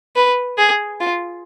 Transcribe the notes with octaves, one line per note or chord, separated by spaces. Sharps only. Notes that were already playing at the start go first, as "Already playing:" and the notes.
B4
G#4
F4